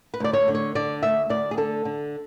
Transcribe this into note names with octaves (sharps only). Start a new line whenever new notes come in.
B4
D2 D5
C#5
D3
C#5
D3 D5
D2 E5
D2 D5
G#4
D3 A4
D3